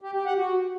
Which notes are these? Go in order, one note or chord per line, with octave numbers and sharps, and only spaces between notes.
G4
G4
F#5
F#4